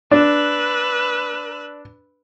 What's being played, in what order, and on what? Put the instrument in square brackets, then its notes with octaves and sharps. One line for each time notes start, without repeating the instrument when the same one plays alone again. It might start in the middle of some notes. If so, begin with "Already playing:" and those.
[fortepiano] D4 [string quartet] B4 E6 F#6